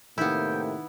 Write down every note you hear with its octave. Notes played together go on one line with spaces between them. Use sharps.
A2 C3 D#3 A#3 B3 E4 G5